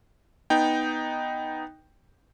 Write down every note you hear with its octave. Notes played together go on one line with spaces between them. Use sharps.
B3 D#4 G5